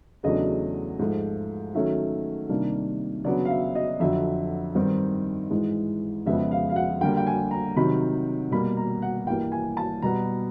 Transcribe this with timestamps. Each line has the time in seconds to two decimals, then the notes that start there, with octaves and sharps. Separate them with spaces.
0.23 E2 C#3 F#3 A3 D4 D#5
0.99 G#2 F3 A3
1.75 D#3 F#3 A3 C#4 E5
2.49 C3 D#3 G3 A#3 D4
3.24 C#3 F#3 B3 D4 D5
3.45 F5
3.50 E5
3.75 D#5
4.00 F2 D3 F#3 E5
4.75 G2 D#3 G3 C4 D#4
5.51 G#2 E3 G#3
6.26 F2 C#3 F3 G#3 B3 E5
6.51 F5
6.70 F5
6.76 F#5
7.01 D3 G3 A#3 G5
7.17 G5
7.27 G#5
7.51 A#5
7.76 C3 D#3 F#3 B5
8.51 B2 G3 A#3 B5
8.77 A#5
9.02 F#5
9.27 G2 E3 G3 A#3 G5
9.52 G#5
9.77 A5
10.02 B2 G3 B3 A#5